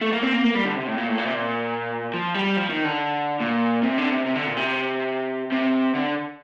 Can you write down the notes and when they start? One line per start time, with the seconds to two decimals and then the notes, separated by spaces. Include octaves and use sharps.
0.02 A3
0.12 A#3
0.23 C4
0.34 A#3
0.44 A#3
0.55 G3
0.65 D3
0.76 C3
0.87 A2
0.98 A#2
1.08 A2
1.18 A#2
1.26 C3
1.34 A#2
2.14 F3
2.34 G3
2.57 F3
2.70 D#3
2.85 D3
3.41 A#2
3.83 C3
3.98 D3
4.12 C3
4.26 C3
4.35 D3
4.47 A#2
4.57 C3
5.52 C3
5.95 D3